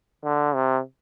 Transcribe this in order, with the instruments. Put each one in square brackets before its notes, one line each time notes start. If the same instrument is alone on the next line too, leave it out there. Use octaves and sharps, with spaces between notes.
[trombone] D3
C3